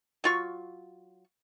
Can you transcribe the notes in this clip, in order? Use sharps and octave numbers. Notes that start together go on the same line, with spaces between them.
F#3 F4 C#6